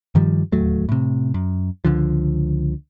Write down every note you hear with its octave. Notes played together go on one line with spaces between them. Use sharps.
G2 D#3 F3 G3
D1 D#2 F#3 A3
A2 C3
F#2
C#2 D3 F3